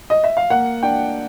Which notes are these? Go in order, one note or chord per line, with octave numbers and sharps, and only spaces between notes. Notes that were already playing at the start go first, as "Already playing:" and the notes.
D#5
E5
F5
A#3 F#5
D4 G5